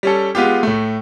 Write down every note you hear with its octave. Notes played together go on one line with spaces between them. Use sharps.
G3 C#4 A4
G#3 B3 F4 G4
A2 A3